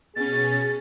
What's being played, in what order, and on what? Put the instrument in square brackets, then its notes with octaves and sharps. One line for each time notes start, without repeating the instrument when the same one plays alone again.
[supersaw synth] B2 C#4 [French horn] G#4 [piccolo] A6